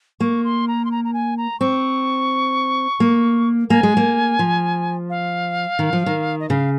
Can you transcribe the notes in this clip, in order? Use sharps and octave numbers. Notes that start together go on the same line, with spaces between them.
A#3 C#6
C6
A#5
C6
A#5
A#5
G#5
A#5
C4 C#6
A#3
A#3 G#5
G#3
A#3
F3
F5
D#3
F3
D#3
D#5
C#3 F5